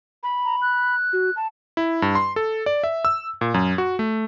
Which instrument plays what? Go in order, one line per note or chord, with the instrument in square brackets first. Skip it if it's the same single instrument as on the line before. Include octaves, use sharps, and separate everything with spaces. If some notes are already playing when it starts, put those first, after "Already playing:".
[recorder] B5
[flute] A#5
F#6
[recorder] F#4
A5
[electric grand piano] E4
G2
C6
A4
D5
E5
E6
A#2
F#2
F#4
A3